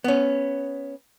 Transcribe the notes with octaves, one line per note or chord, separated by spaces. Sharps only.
B3 C#4